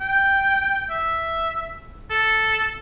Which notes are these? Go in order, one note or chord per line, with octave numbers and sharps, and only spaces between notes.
G5
E5
A4